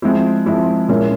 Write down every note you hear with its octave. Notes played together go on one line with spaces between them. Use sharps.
F3 G#3 C4 E4
F3 G#3 C4 E4
A#2 G#3 C#4 E4